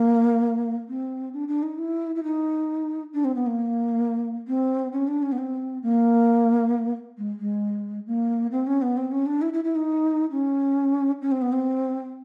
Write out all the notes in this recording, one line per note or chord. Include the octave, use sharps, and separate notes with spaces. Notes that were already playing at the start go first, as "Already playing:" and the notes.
Already playing: A#3
C4
D4
D4
D#4
E4
E4
D#4
D4
C4
B3
A#3
C4
C#4
D4
C#4
B3
C4
A#3
G#3
G#3
A#3
C4
C#4
B3
C4
C#4
D4
E4
E4
E4
D#4
C#4
C#4
C4
B3
C4